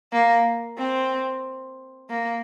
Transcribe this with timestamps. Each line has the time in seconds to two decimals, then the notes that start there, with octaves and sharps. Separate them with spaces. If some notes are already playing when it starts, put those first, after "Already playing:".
0.13 A#3
0.78 C4
2.10 A#3